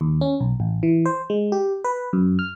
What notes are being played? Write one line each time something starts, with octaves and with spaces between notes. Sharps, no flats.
D#2
C#4
B1
A1
E3
C5
G#3
G4
B4
F#2
F6